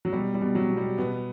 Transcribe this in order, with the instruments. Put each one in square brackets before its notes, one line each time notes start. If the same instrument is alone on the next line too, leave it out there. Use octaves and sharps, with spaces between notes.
[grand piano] F#3
B2 G3
G3
B2
F#3
B2
G3
B2 B3